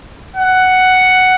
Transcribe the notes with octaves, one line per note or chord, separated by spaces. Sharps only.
F#5